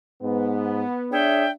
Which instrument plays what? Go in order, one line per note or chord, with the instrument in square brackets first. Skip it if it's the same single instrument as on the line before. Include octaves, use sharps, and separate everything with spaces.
[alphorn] G#2 [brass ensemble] B3
[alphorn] D4 [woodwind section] G#4 C#5 E5 [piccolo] G5